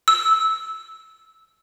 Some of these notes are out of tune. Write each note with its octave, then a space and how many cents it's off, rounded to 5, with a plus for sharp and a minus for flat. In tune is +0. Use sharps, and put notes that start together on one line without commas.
E6 -15